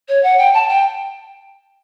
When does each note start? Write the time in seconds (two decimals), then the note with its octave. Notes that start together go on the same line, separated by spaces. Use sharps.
0.08 C#5
0.23 F#5
0.38 G5
0.54 A5
0.69 G5